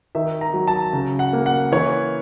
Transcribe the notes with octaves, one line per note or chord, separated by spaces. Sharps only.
D#3 E5
A#5
F#3
A5
C#3
F#5
A#3
F#5
E3 C#5